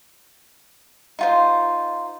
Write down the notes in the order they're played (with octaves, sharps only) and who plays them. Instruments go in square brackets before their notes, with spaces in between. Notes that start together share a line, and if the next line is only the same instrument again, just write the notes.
[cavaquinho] D#4 F4 C5